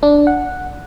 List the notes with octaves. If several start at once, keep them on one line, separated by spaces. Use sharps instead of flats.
D4
F#5